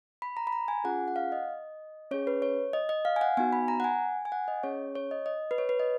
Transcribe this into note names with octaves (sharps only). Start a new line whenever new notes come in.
B5
A#5
B5
A#5
G#5
C#4 F4 G#4 F#5
F#5
F5
D#5
C#4 G#4 C#5
B4
C#5
D#5
D#5
F5
G#5
F#5
B3 D#4 F#4 G#5
B5
A#5
F#5
G#5
G#5
F#5
D#5
C#4 G#4 C#5
C#5
D#5
D#5
B4
C#5
B4
D#5